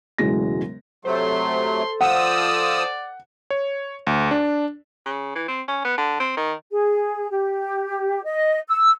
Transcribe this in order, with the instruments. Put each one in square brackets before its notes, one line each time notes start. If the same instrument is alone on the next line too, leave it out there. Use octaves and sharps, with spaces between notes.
[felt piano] E1 A2 C#3 F#3 G#3 A#6
[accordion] C3 F#3 A3 [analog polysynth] A4 C5 [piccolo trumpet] C6
[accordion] F3 D#6 E6 [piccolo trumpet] D5 [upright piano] F#5
[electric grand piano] C#5
D2
D4
[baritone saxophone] C#3
E3
C4
C#4
B3
D3
C4
D#3
[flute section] G#4
G4
D#5
E6